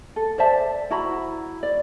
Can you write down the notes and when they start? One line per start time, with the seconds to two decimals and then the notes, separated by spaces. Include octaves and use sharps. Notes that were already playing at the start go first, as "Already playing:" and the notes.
0.16 A4
0.38 C5 D5 E5 A5
0.91 E4 F#4 A#5 B5
1.63 D5